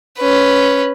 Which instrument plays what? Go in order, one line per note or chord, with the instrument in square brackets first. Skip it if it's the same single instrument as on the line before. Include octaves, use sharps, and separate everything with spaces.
[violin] C#4 B4